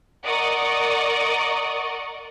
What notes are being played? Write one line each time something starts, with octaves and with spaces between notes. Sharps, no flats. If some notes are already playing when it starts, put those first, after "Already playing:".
A#4 D5 D#5 F#5 C#6 D#6